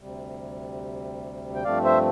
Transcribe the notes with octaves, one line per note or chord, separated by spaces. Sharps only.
D2 C3 G3
G5
G2 F3 A3 C4 D5 F5
C5 E5